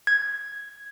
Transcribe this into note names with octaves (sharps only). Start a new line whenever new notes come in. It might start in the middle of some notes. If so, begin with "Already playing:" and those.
G#6